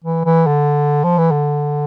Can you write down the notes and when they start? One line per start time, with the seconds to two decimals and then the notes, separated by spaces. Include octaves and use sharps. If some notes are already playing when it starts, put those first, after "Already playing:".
0.04 E3
0.25 E3
0.47 D3
1.04 F3
1.18 E3
1.31 D3